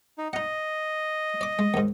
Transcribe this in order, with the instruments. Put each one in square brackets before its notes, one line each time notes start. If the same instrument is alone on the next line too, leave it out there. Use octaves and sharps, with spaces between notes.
[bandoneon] D#4
[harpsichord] D#4 F#5 [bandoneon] D#5
[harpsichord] D5 D6
G#3
D#2 G#2